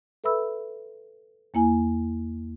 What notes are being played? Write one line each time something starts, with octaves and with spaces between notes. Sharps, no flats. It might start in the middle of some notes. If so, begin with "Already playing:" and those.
A4 B4 E5 B5 E6
E2 A#3 E4 G#5